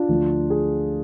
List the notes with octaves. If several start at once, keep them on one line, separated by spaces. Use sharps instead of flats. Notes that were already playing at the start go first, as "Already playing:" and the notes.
Already playing: D4 F4
D2 D3 F3
G#4